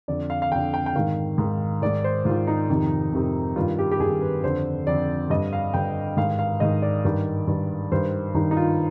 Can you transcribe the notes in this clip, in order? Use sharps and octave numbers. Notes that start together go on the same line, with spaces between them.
F2 D3 D5
F5
F5
F2 D3 G5
G5
G5
G#2 D#3 F5
G#2 D#3
G#2 D#3 D5
C5
G#2 D#3 F4
D#4
F2 C3 D#3
F2 C3 D#3
G2 D#3 F4
G4
G4
G2 D#3 G#4
B4
F2 D3 C5
F2 D3 D5
G2 D3 D#5
F5
G2 D3 G5
G#2 D#3 F5
F5
G#2 D#3 D#5
D5
G2 D#3
G2 D#3
G2 D#3 C5
G2 D#3 D#4
D#4
F4